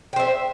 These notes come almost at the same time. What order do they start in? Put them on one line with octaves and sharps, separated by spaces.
G5 C5 E5